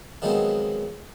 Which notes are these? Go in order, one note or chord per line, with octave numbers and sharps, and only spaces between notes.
D#3 F3 F#3 G#3 B3 C4